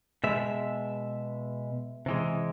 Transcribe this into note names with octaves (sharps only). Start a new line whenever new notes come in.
B2 G#3 E5
C3 E3 G#3